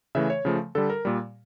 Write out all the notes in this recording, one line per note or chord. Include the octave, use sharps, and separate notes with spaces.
C#3 E3 A3 E5
C#5
C#3 F3 A3
D3 G3 A4
A#4
A#2 G3